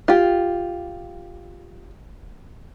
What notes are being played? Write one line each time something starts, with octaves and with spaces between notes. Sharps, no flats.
F4 G4